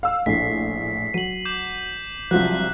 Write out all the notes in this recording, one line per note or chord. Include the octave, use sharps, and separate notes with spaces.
F5 E6
A#1 A2 B6 C7
F#3 D#7 F#7
D6 G6 E7
C2 F3 F#3 F#6 B6